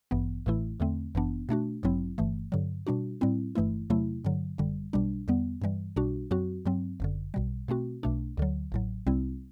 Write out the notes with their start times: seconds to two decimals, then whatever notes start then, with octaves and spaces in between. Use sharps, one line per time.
0.11 A1 G2 E3 B3
0.46 A1 A2 E3 A3 E4
0.80 E2 D3 A3 C4
1.15 G1 F#2 E3 B3 D4
1.49 B2 A3 D4 F#4
1.83 A1 G2 F#3 C4 E4
2.18 G1 G2 E3 A3
2.52 G2 D3 F#3
2.87 B2 G3 D4 F#4
3.21 A2 G3 C4 E4
3.55 G1 G2 E3 A3 E4
3.90 E2 C3 F#3 A3 E4
4.25 G2 D3 F#3
4.58 G1 F#2 D3 G3
4.93 B1 B2 G3 D4
5.28 E2 D3 G3 B3
5.62 G2 E3 G3
5.96 B1 B2 G3 D4 F#4
6.31 F#2 F#3 C4 F#4
6.66 G2 F#3 C4
7.00 G1 F#2 D3
7.34 B1 B2 G3
7.68 B2 A3 C4 F#4
8.03 B1 B2 A3 D4
8.37 D2 D3 F#3
8.72 A1 A2 F#3
9.07 C2 C3 G3 C4 E4